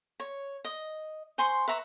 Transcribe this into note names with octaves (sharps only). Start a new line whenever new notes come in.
C#5
D#5
C5 G#5 C6 C#6
B4 E5 A#5 C#6